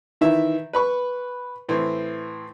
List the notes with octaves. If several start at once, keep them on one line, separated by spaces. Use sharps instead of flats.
D#3 E3 E5
B4 B5 C#6
A2 E3 C4